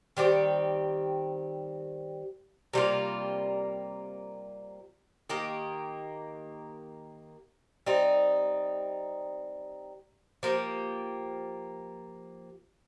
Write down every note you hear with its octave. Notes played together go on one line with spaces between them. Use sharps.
D#3 G3 C4 G4
C3 G3 A#3 F4
D#3 A#3 G4
G3 C4 D#4
F3 A#3 G4